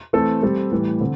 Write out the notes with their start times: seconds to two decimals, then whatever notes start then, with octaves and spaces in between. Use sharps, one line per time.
0.13 E3 A3 C4 A4
0.43 G3 C4 A4
0.72 A2 E3 G3
1.01 D3 C4